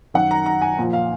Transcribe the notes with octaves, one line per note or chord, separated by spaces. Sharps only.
F#2 D#3 F#5
A#5
A#5
G#5
A#2 F3
F5